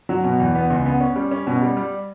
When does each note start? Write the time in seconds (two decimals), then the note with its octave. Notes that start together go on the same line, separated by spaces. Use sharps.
0.09 F#3
0.24 B2
0.40 E2
0.55 B3
0.70 C#2
0.86 B3
1.00 C#4
1.16 G3
1.31 C#4
1.47 B2
1.62 G3
1.77 G3